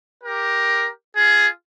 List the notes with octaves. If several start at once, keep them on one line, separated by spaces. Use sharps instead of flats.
G4 A#4
F4 G#4